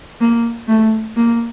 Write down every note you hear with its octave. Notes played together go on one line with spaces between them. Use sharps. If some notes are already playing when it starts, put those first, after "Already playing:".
A#3
A3
A#3